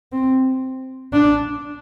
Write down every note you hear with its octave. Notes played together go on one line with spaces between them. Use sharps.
C4
D4